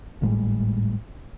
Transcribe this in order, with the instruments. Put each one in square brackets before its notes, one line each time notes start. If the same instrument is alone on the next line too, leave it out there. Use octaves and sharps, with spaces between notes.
[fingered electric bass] G#1 A2 G3 G#3